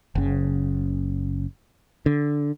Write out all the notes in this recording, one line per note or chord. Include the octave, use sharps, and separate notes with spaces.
F#1 C#3
D3